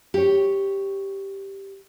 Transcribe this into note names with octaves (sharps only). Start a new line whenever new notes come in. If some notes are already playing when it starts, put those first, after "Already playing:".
G4 C#5